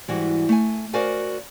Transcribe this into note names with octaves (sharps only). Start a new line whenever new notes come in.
G#2 E3 G3 F#4
A3 G#5
F#4 A#4 C5 D5 F5 G#5